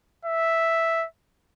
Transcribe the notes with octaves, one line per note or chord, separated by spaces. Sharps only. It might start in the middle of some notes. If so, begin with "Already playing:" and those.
E5